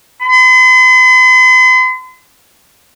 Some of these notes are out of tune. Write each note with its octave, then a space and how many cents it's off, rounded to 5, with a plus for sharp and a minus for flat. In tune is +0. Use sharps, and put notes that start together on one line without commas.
C6 -45